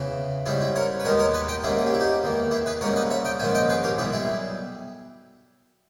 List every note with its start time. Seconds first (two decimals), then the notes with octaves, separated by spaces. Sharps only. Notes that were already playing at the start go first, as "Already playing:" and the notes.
Already playing: E2 C#3 E3
0.46 G#2 G3 C#4 E4 G#4
0.61 E4
0.76 A#4 C#5
1.00 B4
1.05 D#2 D#3 G#3 B3 A#4 C#5
1.19 A#4 C#5
1.34 B4 D#5
1.48 D#5 G5
1.64 G#2 G3 A#3 C#4 E4 G#4
1.78 G#4
1.86 G4
1.94 E4
2.00 D#4 G4
2.23 E2 D#3 A#3
2.51 E4 G#4
2.66 G#4 B4
2.81 G#2 G3 A#3 C#4 A#4 C#5
2.96 B4 D#5
3.10 C#5 E5
3.25 D#5 G5
3.39 A#1 G#2 D#3 G#3 C#4 E5 G#5
3.55 D#5 G5
3.69 G#4 B4
3.83 G4 A#4
3.98 B1 B2 G3 E4 G#4
4.13 E4 G#4